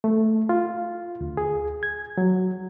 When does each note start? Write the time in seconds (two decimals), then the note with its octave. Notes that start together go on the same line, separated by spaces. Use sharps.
0.04 A3
0.49 F4
1.21 D2
1.37 G#4
1.83 G#6
2.18 F#3